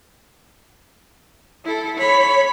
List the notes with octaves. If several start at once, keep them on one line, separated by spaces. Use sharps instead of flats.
E4 A4
C#5 B5